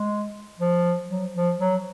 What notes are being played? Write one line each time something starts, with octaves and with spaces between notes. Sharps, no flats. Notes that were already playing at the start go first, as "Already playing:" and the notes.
Already playing: G#3
F3
F#3
F3
F#3